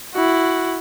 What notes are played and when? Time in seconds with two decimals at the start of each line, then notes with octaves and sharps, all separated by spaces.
0.14 E4 F#4